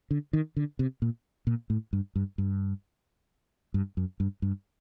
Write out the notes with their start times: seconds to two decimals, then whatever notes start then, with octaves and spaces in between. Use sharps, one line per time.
0.11 D3
0.33 D#3
0.57 D3
0.79 C3
1.02 A#2
1.47 A#2
1.70 A2
1.93 G2
2.16 G2
2.38 G2
3.74 G2
3.97 F#2
4.20 G2
4.42 G2